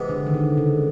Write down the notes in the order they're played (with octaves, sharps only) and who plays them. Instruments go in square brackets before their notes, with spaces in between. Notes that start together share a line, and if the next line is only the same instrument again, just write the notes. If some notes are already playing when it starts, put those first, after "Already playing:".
Already playing: [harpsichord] C3 E3 G#3 B3
[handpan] D3
D#3
D3
C#3